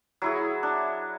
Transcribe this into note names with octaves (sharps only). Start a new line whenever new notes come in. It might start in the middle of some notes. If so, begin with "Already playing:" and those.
F#3 E4 G#4
D4